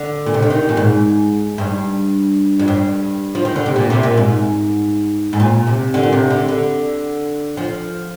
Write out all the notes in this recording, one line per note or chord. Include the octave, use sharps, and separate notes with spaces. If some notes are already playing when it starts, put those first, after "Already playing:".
Already playing: D3
A#2
C3
D3
D#3
A#2
G#2
G2
F2
G2
F3
D#3
D3
C3
A#2
C3
A#2
G#2
G#2
A#2
C3
D3
A#2
C3
D3
D3
F3